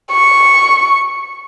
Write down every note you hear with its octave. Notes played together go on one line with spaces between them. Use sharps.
C#6